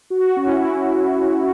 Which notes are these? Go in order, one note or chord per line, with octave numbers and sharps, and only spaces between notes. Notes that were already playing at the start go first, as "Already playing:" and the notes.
F#4
C#4
E4
C#4